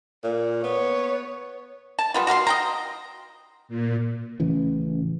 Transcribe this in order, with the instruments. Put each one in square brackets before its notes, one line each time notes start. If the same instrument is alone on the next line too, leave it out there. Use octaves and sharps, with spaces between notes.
[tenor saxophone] A#2
[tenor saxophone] B3 [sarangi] C#5
[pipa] A5
G3 B3 F4
F#4 F5 A#5 C6
D#5 G5 A#5
[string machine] A#2
[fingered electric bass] A1 C#3 E3